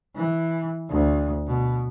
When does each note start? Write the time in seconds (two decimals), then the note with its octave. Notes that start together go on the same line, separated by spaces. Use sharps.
0.16 E3
0.89 D2
1.47 B2